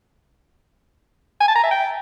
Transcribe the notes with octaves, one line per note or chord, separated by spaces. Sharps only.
G#5
A5
A#5
E5
G5